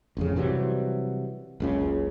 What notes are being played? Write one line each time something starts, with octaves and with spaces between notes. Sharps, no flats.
A1 F2 C#3
C3 E3 F#3 G3
F#1 C#2 C#3